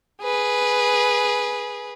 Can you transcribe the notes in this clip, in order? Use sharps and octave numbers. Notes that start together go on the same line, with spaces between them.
G#4 B4